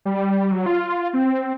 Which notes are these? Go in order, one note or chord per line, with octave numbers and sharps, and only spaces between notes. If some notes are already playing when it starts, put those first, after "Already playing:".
G3
F#3
F4
C4